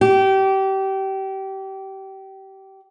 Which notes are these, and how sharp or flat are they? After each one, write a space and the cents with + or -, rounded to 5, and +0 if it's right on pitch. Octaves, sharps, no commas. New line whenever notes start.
G4 -25